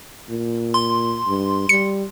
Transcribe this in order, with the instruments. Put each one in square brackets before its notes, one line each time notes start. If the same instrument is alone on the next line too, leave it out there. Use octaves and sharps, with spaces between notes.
[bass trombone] A#2
[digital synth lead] C6
[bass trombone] G2
[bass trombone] G3 [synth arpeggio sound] C#7